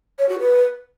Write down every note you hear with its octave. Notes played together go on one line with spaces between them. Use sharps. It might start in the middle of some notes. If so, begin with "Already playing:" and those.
C#5
F#4
B4